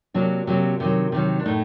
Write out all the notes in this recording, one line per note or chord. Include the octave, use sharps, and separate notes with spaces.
C3 F#3 A#3 D4
C3 F#3 A#3
C3 D#3 F#3
C3 D#3 F#3
D4
A2 A3 D#4